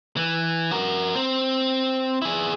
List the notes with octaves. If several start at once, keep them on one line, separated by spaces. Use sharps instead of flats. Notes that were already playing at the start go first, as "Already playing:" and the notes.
E3
F#4 A#4
C4
E4 G#4